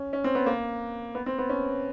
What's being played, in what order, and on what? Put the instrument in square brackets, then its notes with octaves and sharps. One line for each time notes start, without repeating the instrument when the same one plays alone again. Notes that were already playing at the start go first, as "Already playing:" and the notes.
Already playing: [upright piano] C#4
C#4
C4
B3
A#3
B3
C4
B3
C#4